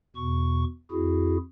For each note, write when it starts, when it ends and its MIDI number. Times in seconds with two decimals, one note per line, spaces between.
0.16 0.64 40
0.16 0.64 47
0.16 0.64 85
0.91 1.37 41
0.91 1.37 64
0.91 1.37 66
0.91 1.37 68